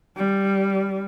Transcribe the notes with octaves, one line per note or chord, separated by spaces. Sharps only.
G3